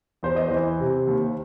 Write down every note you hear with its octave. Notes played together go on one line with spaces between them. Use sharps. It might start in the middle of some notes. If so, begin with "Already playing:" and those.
E2 C5
D#5
E3 C5
C3
D#2